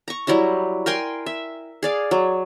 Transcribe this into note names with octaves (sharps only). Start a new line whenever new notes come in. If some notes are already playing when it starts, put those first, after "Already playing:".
A#5 C#6
F#3 G3 E4 A#5
A#4 G5 G#5 C6
E5
G#4 D5 F5
F#3